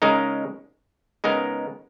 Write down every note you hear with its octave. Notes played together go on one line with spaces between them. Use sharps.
C#3 G#3 D#4 A#4
C#3 G#3 B3 D#4 A#4